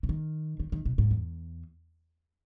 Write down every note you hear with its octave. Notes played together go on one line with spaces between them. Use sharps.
C#3
D#3
D#3
D#3
B2
G#2
E2